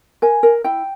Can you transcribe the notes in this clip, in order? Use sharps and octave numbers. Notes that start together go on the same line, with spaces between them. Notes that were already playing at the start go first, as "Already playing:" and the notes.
A#4 G#5
A#4
E4 G5